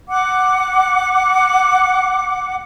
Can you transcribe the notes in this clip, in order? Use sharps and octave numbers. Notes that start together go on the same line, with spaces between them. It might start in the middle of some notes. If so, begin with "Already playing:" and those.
F#5 D6